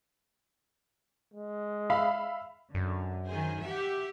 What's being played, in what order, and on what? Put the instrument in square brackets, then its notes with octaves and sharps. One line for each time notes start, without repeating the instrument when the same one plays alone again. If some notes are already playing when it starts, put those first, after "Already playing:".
[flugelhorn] G#3
[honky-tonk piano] E5 F5 B5
[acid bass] F#2 [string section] D3
[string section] D#3 G#4 C5
G4 E5 F#5